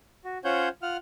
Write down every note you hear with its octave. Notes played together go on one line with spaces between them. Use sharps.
F#4
C#4 F4 C5 C#5 F#5 G6
F4 F#5 F6